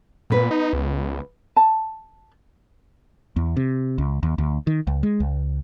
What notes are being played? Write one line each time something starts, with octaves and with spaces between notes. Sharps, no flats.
A#2 B3 B4
D#4
C#2
A5
E2
C3
C#2
D#2
D2
D#3
C#2
G#3
C#2